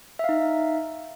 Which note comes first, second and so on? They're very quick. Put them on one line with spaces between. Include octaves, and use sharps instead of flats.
E5 F5 D#4